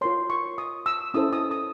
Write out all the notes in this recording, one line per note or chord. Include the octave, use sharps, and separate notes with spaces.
F4 A#4 C#5 C6
C#6
D#6
E6
C#4 E4 A4 C5 D#6
D#6
D#6